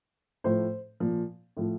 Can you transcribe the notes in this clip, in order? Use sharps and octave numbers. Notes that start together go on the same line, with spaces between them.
A2 F3 C5
A#2 F3
A2 F3